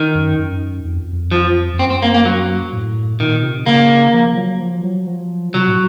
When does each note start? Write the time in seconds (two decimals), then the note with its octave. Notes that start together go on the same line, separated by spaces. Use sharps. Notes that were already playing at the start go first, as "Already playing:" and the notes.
Already playing: D#3
0.15 F#2
0.38 F#2
0.85 F2
1.12 F2
1.31 F3
1.74 F2
1.79 F#2 C4
1.90 C4
2.02 A#3
2.14 A#3
2.25 F#3
2.73 A2
3.20 A#2 D#3
3.43 C3
3.66 C#3 A#3
4.13 F3
4.36 F#3
4.60 F3
4.83 F#3
5.07 F3
5.54 C3 F#3
5.68 A2